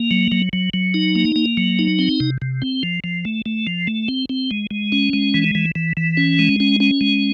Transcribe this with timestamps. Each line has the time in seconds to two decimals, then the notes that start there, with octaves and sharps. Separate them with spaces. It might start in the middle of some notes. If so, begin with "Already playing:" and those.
Already playing: A#3
0.11 F#3
0.32 F#3
0.53 F#3
0.74 F#3
0.94 D#4
1.15 A#3
1.36 A#3
1.57 F#3
1.79 D#4
1.99 C4
2.20 C3
2.42 C3
2.62 C4
2.83 F3
3.04 F3
3.25 A3
3.46 A3
3.67 F3
3.87 A3
4.08 C4
4.29 C4
4.51 G#3
4.71 G#3
4.92 C#4
5.13 G#3
5.34 E3
5.55 E3
5.75 E3
5.97 E3
6.17 C#4
6.39 G#3
6.60 C#4
6.80 C#4
7.01 G#3